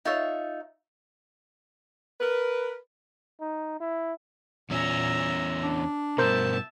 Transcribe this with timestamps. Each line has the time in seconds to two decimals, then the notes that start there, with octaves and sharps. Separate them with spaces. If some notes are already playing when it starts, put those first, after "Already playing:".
0.05 D#4 F4 C#5 E5
2.21 A#4 B4
3.40 D#4
3.80 E4
4.70 E2 A#2 C#4 E5 A#5
5.63 D4
6.18 G2 B2 A#4 C5 E5 A5 G6